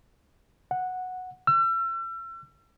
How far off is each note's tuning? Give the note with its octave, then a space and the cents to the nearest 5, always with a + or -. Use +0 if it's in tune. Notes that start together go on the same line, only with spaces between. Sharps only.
F#5 -5
E6 +40